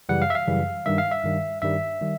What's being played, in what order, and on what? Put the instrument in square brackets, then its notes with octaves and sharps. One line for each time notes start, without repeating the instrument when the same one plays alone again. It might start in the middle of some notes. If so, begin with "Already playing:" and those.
[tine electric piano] F#2 C#3 E3 G3 F#5
F5
E5
F5
F#2 C#3 E3 G3
G2 D#3 G3 E5
F5
E5
G2 D#3 G3
G2 D#3 G3 E5
D#3 G3